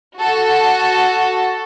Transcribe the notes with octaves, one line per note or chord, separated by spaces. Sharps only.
F#4 A4